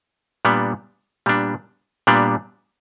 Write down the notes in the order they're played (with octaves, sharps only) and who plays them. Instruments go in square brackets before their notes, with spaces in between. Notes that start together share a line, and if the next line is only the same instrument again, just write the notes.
[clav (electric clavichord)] A#2 G3 B3 D4
A#2 G3 B3 D4
A#2 G3 B3 D4